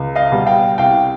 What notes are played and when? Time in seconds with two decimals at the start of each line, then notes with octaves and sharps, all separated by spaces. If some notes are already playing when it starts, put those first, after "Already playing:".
Already playing: C#2
0.15 D#5 F5
0.32 B2 G3
0.46 F5 G5
0.78 C2 F5 G5